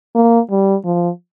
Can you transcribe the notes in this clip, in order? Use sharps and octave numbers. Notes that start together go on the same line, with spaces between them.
A#3
G3
F3